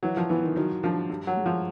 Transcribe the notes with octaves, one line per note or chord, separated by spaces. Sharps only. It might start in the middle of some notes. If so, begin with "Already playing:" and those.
E3 F#3
F3
E3 B3
D#3
D#3 F#3
F3 D4
G2
F#3
G#3
F3